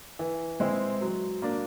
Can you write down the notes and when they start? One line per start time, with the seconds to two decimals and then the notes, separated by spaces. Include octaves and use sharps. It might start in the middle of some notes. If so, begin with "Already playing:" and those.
0.19 E3
0.60 G#3 C4 E4
1.01 F#3
1.42 A#3 D4